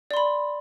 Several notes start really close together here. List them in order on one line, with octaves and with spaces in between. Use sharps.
D5 C6 B5